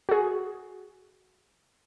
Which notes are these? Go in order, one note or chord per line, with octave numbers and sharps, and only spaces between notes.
F#4 G#4